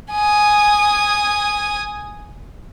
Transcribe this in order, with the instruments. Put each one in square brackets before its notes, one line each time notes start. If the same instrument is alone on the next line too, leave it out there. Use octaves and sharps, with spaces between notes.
[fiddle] G#5 D#6